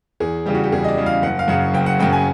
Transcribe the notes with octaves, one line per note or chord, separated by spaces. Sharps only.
E2 G#4
C#3 E3 G3 G4
F#4
G4
E2 G#4
D#5
D5
C#3 E3 G3
F5
F#1 F#5
F5
F#2 C#3 F#5
F#1 G5
F#5
F#2 C#3 G5
G#5